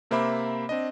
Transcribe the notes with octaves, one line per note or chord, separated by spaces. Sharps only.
C3 A#3 C5 E5 B5 D6
C4 D4 D#5